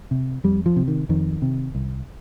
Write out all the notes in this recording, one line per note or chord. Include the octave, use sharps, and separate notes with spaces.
C3
F2 G3
F3
C3
D#3
F2 D#3
C3
C2